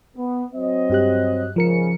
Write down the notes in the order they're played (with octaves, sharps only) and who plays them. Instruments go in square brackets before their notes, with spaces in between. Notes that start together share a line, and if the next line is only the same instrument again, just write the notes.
[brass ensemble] B3
F#3 C4 D#5
[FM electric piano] G2 G4 F#6
[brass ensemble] G#2 C#3 [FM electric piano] F3 A#4 C#7